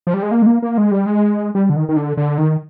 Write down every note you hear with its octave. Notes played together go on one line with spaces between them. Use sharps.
F3
G3
G#3
A#3
G#3
A#3
A#3
G#3
G3
G#3
G3
D3
D#3
D#3
D3
D3
D#3